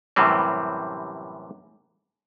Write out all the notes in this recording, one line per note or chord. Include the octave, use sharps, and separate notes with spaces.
F#2 A2 C3 E3 G3 C4